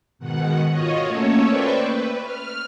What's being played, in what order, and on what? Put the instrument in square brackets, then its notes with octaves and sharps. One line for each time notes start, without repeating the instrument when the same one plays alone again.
[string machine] G#2 B2 D#3 F#5
F4 F#4 C#5 D#5
A3 A#3 C#4 A4 C#5
B4 C5 D5 E5 G5 C#6
B4
F6